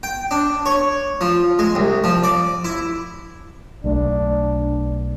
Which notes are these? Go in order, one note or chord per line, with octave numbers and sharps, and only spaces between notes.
G5
D4
C#5
F3
G#3
C2
F3
D5
E4
B1 A3 D4